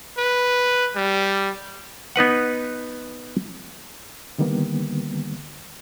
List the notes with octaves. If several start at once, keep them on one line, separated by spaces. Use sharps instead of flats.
B4
G3
B3 D#4 B4 F#5
D3 D#3 G3 A#3 B3